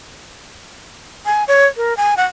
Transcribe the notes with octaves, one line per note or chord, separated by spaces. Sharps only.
G#5
C#5
A#4
G#5
F#5